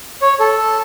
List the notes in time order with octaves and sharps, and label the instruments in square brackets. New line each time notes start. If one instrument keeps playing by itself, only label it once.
[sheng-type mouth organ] C#5
A4